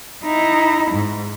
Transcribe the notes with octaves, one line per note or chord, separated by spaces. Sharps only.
D#4 E4
G#2